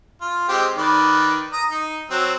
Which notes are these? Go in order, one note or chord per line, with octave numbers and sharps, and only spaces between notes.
F4
G#3 C4 G4
D#3 B4 D5
A#5 D#6
D#4
F#3 C4 E6